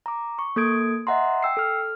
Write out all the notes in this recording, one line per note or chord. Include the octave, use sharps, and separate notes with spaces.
A#5 D6
C#6
A#3 A4 D#6 G#6 D7
D#5 E5 F#5 A#5 C6
G5 E6 C7
A4 F6